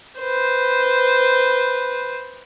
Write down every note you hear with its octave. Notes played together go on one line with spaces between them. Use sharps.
B4 C5